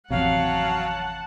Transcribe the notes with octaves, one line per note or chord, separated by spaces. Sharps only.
A1 F2 C3 F#3 F5 F#5 A5